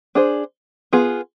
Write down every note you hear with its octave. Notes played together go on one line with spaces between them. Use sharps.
D4 G#4 C5
B3 F4 G#4